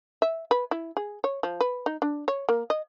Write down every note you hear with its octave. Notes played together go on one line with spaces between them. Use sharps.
E5
B4
E4
G#4
C#5
F3
B4
D#4
D4
C#5
A#3
D#5